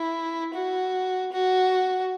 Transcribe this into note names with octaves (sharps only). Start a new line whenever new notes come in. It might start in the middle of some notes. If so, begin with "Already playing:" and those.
Already playing: E4
F#4
F#4